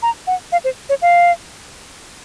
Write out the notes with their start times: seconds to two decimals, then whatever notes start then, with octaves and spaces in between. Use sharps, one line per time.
0.02 A#5
0.27 F#5
0.52 F5
0.64 C5
0.89 C#5
1.02 F5